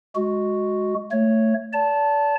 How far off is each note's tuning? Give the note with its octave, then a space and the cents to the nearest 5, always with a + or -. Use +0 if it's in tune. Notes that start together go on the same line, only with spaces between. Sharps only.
G#3 +5 F#4 +0
A3 +15 C#5 +0
D5 -35 A5 +0